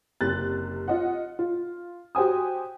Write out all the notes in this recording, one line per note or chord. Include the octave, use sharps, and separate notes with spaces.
F#1 C3 F#6 A6
F4 D#5 F#5
F4
F#4 G4 C5 G#5 D#6